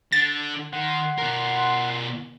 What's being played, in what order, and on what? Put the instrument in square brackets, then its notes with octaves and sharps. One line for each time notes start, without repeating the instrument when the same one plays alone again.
[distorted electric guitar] D3 [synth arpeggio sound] A6
[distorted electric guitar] D#3 [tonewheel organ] F#5 C6
[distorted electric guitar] B2 A#4